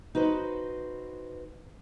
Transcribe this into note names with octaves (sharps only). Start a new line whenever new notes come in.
D#4 F#4 B4 C5